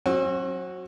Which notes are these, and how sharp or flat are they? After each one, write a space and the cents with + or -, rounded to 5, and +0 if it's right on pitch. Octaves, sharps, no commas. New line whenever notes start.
F#3 -10 C4 +45 F#4 +0